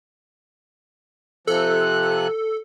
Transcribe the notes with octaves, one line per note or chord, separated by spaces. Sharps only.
C3 F3 A4 F#6